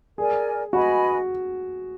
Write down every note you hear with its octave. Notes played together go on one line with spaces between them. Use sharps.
G#4 A#4 D5 G#5
F#4 B4 D#5 G#5 B5